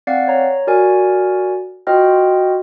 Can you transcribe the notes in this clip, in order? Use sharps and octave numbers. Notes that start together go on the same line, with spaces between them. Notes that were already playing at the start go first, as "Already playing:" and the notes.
C4 D5 F5 F#5 C7
C#5 A#5
F#4 A#4 D5 G#5
F4 F#4 C5 D#5 G5 F6